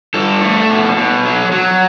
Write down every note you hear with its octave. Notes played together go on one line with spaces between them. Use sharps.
G2 A4
A3
B2
B2
F#3
F#3